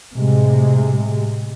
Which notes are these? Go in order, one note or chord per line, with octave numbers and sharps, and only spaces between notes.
A2 C3 G#3